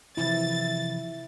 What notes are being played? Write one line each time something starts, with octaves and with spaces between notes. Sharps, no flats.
C3 E3 F3 E4 A6